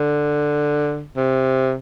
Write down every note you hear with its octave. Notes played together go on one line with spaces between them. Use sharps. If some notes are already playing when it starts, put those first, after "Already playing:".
Already playing: D3
C3